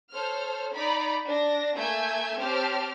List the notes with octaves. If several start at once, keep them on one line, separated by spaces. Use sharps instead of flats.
A4 C5 C#5 F6
D#4 D5 A#5 B5
D4 A#6
A3 A#3 G#5 E6 G6 G#6
C4 G4 C5 C#5 A5 F6